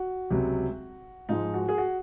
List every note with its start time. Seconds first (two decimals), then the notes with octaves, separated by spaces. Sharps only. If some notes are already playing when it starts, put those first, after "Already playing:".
Already playing: F#4
0.30 C#2 C3 F#3
1.29 G#2 F3 G#3 D#4
1.54 F#4
1.69 G#4
1.78 F#4